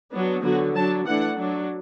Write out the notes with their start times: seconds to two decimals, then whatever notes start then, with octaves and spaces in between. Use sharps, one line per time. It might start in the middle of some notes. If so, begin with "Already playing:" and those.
0.11 F#3 B3 D4
0.42 D3 F#3 B3 F#4
0.75 F#3 D4 A5
1.06 E3 A3 D4 F#5
1.38 F#3 D4